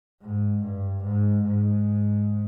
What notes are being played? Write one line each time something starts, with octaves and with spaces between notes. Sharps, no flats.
G#2
G2
G#2
G#2